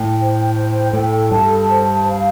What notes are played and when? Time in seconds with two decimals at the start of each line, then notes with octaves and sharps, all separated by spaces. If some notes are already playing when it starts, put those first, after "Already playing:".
Already playing: A2 G5
0.19 C5
0.56 G5
0.93 A2 A4
1.30 G2 A5
1.68 C5
2.05 F5